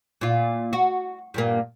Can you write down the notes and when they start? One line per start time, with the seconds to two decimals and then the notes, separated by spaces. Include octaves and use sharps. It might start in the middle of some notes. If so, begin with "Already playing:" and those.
0.21 A#2 F4
0.73 F#4
1.34 G2 A#2 A#3